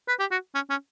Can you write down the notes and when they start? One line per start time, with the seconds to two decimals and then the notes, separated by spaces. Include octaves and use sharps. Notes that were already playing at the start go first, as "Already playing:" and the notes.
0.08 B4
0.20 G4
0.31 F#4
0.55 C#4
0.70 C#4